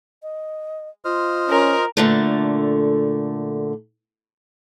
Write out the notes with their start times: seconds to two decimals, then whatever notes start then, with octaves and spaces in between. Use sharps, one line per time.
0.23 D#5
1.05 F4 C5 D#5 F6
1.50 C#4 A#4
1.97 A#2 D3 A3